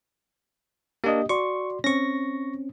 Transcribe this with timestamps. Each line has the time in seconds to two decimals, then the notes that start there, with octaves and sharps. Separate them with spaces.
1.04 A#3 D4 G4 D#5
1.29 F#4 D5 C6 C#6
1.84 C4 C#4 C#6 A#6